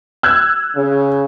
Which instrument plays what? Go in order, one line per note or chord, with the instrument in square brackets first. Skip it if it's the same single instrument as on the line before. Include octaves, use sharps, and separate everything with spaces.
[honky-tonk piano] E6 F#6 G#6
[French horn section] C#3